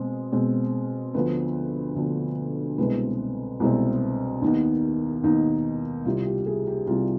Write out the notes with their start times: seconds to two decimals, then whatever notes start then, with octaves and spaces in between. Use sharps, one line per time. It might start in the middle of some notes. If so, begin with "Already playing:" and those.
Already playing: B2 G#3 C4
0.32 B2 G#3 C4
1.14 D2 D3 F3 B3 B4
1.96 D2 D3 F3 B3
2.78 C2 B2 G#3 C4 B4
3.60 C2 B2 G#3 C4
4.42 D#2 D#3 B3
5.24 D#2 D#3 B3 D#4
6.05 C2 C3 G3 F4
6.26 G4
6.46 G#4
6.67 G4
6.87 C2 C3 G3 F4